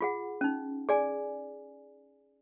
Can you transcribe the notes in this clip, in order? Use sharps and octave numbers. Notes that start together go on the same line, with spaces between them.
F4 G#4 F#5
C#4 D#4
G#4 D5 G#5